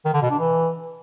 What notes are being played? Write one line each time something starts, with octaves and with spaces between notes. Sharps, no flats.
D#3
D3
B2
D4
E3